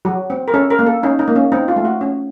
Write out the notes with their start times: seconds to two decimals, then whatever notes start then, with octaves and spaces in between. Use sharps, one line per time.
0.05 F#3 F#4
0.30 C4
0.48 A#4
0.54 C#4 A4
0.70 A#4
0.79 A#3
0.86 A4
1.03 C#4 D#4
1.19 D#4
1.28 A#3
1.35 C#4
1.52 C4 D#4
1.68 F4
1.76 A3
1.85 F#4
2.01 C#4